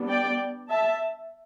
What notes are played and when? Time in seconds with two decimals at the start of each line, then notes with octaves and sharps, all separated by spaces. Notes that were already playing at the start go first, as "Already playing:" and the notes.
Already playing: G3 B3 D4
0.09 D5 G5
0.70 E5 A5